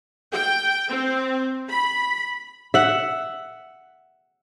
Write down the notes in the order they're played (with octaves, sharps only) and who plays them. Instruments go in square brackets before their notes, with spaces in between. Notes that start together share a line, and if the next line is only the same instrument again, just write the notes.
[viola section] G5
C4
B5
[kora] E5 F#5